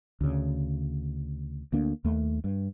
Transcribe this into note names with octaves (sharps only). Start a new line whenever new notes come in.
D2 C#3
D2 A#3 D4
D#2 A3
G2